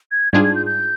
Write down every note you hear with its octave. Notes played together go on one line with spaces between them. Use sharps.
G#6
G#2 G3 D4 F4 G#4 G#6
G#6
G6
G6